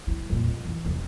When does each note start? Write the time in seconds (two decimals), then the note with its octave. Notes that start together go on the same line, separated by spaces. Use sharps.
0.07 F3 E4
0.30 F2 A#2
0.47 F2
0.65 E3
0.85 F1 E2